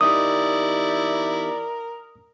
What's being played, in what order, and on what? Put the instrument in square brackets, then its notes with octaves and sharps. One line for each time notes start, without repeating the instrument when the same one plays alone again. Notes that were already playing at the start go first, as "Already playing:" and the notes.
[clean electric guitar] E2 D#4 G4 [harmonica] E4 D5 [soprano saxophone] A#4 [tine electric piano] D#6